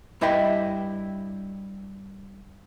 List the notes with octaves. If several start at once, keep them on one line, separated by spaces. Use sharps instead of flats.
G2 E4 D#5 G5 B5